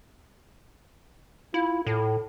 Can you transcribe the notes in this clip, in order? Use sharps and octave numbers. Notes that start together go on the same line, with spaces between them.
E4 F4
A2 A4